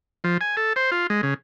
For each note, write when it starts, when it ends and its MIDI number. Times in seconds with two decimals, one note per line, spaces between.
0.24 0.37 53
0.41 0.56 80
0.57 0.73 69
0.76 0.91 72
0.92 1.07 65
1.10 1.21 56
1.23 1.34 49